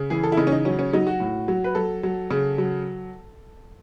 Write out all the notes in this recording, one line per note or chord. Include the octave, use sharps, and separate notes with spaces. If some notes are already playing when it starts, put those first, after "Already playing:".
Already playing: C#3
E3 G#4
A4
E4
C#3 D#4
C#4
D#4
F#3 C#4
C#4
F#3 D#4
F#4
A2
F#3
B4
F#3 A4
F#3
C#3
F#3